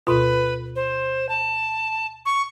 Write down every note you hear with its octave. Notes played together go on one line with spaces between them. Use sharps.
D2 B2 F4 B4
C5
A5
C#6